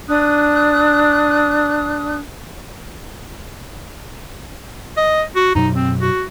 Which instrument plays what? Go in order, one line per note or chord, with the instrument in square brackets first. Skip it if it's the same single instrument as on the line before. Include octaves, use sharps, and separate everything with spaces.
[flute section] D4 D#6 F#6
[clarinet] D#5
F#4
[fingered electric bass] F#2 B2 F#3 [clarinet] D#4
[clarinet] C4
F#4